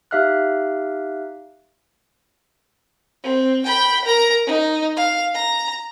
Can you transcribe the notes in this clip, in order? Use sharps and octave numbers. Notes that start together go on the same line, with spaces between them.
D#4 G4 E5 F5 F6 F#6
C4
G5 B5
A#4 A#5
D#4
F5
A#5